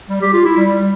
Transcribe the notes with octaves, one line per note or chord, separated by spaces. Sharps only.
G3
G4
F4
E4
G3